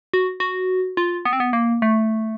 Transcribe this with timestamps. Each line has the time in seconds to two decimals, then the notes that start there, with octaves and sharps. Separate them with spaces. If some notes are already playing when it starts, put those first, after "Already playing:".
0.14 F#4
0.40 F#4
0.97 F4
1.25 B3
1.33 C4
1.40 B3
1.53 A#3
1.82 A3